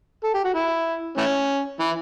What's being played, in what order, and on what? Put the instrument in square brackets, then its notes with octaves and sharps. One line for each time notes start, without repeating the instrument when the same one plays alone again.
[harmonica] A4
G4
F#4
E4
E3 A3 C#4
E3